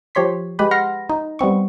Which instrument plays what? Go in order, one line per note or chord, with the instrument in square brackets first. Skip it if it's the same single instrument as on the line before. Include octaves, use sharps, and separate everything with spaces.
[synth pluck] F3 G4 C#5 C6 B6
G#3 G4 B4 B5
F#5 C6 F6 A#6 C#7
D#4
G3 B3 C4 C#6